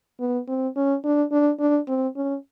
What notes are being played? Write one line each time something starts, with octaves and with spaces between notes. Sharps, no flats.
B3
C4
C#4
D4
D4
D4
C4
C#4